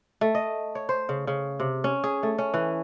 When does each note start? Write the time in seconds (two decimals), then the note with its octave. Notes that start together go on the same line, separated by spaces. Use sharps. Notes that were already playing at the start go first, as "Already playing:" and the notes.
0.21 A3
0.35 D#5
0.75 C#5
0.89 C5
1.09 C#3
1.27 C#3
1.60 C3
1.84 C#4
2.04 G#4
2.23 A3
2.38 C#4
2.54 E3